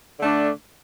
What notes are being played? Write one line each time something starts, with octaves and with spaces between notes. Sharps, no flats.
D3 A3 D4